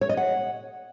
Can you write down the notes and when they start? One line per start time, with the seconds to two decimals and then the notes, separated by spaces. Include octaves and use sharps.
0.01 C#5
0.09 D#5
0.17 F#5